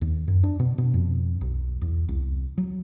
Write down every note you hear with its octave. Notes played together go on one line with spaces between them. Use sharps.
D#2
F#2
D4
B2
B2
F2
B1
E2
C2
F#3